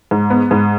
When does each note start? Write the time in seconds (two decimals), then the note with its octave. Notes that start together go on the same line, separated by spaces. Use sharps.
0.11 G#2
0.30 B3
0.51 G#2